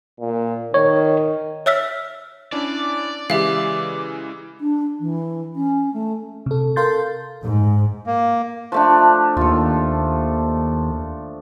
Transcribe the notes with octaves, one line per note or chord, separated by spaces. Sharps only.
A#2
D#3 C#5
C#5 E5 E6 F6 B6
C#4 D4 E4 D5
C#3 E3 G#3 G4 E5 F5
D4
E3
C#4
A3
C3 A4
A4 A#4 F5 C6 G6 A6
G#2
A#3
F3 A3 D4
D#2 F4 A4